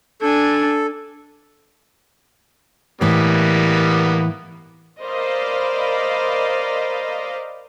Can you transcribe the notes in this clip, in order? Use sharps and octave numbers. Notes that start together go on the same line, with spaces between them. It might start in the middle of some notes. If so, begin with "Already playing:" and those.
D4 A4 G#5
A2 E3 G3 A#3 B3
A#4 C5 D5 D#5 F5 B5